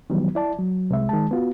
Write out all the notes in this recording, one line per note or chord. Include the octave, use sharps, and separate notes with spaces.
D#3 E3 F#3 G3 B3
E4 D5 A5
F#3
C2 C3 G#3 E5
D#3 G#3 A5
B3 F4 F#4